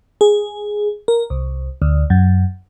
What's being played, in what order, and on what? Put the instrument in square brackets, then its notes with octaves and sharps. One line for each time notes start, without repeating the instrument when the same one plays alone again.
[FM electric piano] G#4
A#4
C2
D2
F#2